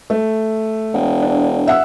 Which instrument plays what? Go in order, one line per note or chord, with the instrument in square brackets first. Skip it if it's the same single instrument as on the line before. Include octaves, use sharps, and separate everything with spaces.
[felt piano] A3
[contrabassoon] E1
[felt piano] D4
E5 F#5 E6